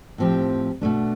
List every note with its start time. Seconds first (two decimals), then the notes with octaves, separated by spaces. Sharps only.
0.18 A2 F3 C4 G4
0.81 B2 A3 D4